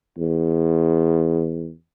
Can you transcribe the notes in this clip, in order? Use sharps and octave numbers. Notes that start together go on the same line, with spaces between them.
E2